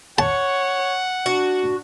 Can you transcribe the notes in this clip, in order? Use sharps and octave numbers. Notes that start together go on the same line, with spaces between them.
C#5 F#5 A5
D4 F#4